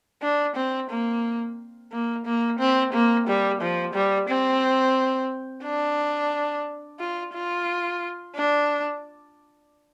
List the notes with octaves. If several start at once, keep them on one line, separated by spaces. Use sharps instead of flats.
D4
C4
A#3
A#3
A#3
C4
A#3
G3
F3
G3
C4
D4
F4
F4
D4